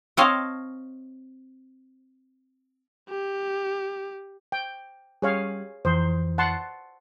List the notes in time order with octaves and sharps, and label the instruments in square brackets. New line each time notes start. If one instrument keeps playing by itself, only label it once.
[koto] C4 C5 C#5 D#5 F5 A5
[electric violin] G4
[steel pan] G5
[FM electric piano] G3 C#4 G4 [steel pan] G#4 C#5 F5
[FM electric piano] F2 E3 [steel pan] C5
[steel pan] F#5 A5 C6